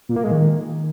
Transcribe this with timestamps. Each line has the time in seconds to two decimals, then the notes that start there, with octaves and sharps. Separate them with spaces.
0.09 A#2
0.16 A#3
0.24 G#3
0.31 D#3